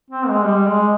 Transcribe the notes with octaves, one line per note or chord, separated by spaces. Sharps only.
C4
G#3
G3
G#3